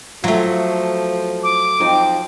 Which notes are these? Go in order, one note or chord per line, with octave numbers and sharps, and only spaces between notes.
F3 F#3 A3 F4
D6
F3 C4 D#4